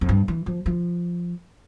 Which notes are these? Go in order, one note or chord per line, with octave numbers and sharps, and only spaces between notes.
F2
G2
E3
F3
F3